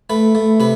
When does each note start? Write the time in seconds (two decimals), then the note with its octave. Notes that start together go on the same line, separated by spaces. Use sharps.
0.10 A3 B4
0.35 A3
0.60 C3 B4